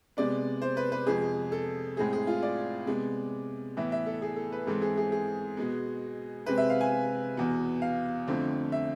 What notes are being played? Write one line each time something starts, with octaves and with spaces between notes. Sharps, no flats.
C3 G#3 B3 D5
C5
B4
B4
F2 C3 G#3 G#4
A4
A2 G#3 C4 G#4
G#4
F4
D5
C3 G#3 B3
A2 E3 B3 E5
E5
A4
G#4
A4
B4
G#2 E3 G#3 C4 A4
G#4
G#4
G#4
B2 G#3 B3
C3 G#3 C4 B4
E5
F5
G#5
E2 B2 B3
F5
F2 D3 A3 C4
E5